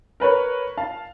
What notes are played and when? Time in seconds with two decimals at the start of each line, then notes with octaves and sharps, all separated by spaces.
0.20 A#4 B4 C#5
0.78 F5 A5